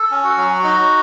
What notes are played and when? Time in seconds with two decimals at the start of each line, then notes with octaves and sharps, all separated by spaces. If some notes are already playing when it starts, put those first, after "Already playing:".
Already playing: A4
0.11 C#4
0.24 F#4
0.37 F#3
0.63 D#4 F#4